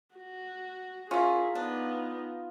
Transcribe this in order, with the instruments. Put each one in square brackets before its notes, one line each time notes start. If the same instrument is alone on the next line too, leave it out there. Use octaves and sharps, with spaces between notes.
[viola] F#4
[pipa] C#4 E4 [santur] F4 [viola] G#4 A#4
[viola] B3 D#4 [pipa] D4